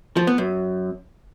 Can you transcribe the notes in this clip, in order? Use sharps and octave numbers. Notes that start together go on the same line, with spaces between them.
F3
B3
F#2